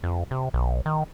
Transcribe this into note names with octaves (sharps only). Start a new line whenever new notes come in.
F2
C3
B1
D#3